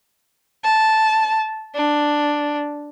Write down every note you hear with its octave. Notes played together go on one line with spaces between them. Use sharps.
A5
D4